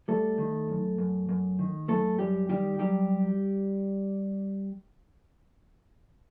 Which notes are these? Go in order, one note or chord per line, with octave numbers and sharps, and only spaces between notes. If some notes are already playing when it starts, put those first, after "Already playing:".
G3 A3 A4
D#3
F#2
F#2
F#2
D#3
F#2 A3 A4
F#2 G3 G4
D#3 G3 G4
F#3 G3 G4